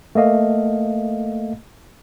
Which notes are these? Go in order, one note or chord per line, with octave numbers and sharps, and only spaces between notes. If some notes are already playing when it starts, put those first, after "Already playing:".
A3 A#3 D#5 F5